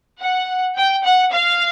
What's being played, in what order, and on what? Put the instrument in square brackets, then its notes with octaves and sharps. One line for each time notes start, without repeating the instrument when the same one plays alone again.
[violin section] F#5
G5
F#5
F5